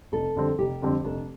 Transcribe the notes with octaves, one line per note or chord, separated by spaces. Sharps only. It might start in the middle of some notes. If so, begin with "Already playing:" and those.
F1 A4
F2 D3 G3 C4
F1 G4
F2 D3 G3 C4
F1 D4